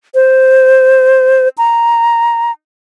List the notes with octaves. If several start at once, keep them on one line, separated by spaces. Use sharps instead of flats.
C5
A#5